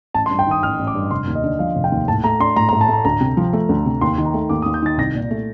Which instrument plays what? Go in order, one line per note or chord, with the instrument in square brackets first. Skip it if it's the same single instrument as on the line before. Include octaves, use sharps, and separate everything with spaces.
[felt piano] A1 [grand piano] A5
[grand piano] C6
[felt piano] G2
[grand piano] G5
[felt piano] D#3 [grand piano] D#6
[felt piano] A1 [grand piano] F6
[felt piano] A1
[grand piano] D6
[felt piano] G2
[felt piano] F1 [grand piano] C6
[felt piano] D#2
[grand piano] D#5
[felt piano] D3
[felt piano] F3 [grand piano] F5
[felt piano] F1
[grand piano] G5
[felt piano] D#2
[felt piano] A2 [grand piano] A5
[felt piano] A3 [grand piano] A#5
[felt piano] D4 [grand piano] C6
[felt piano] A2 [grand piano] A#5
[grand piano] A#5
[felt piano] A2
[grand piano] A5
[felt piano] A3 [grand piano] A#5
[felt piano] D2 [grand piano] A#5
[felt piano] C3
F3
A3
D2
C3
[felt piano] D#2 [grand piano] C6
[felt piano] D#3
[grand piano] A#5
[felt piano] A3
[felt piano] D#2 [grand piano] D6
[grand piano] D#6
[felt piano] D#2
[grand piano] G6
[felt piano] D#3 [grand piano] A6
[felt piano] C2 [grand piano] A#6
[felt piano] A#2
A3